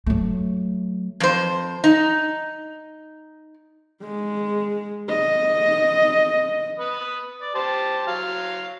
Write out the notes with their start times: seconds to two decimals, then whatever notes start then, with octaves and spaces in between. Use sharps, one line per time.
0.06 F#3 A3
1.20 F2 C5
1.84 D#4
4.03 G#3
5.09 D#5
6.79 B4 B5 D#6
7.42 D5
7.55 G4 C5 A5
8.07 F#3 F5